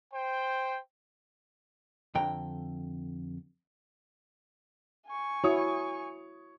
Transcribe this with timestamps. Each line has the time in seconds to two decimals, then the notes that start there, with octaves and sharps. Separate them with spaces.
0.13 C5 G5
2.15 F2 D3 G5 A#5
5.08 G#5 C#6
5.44 E4 F#4 C#5 D#6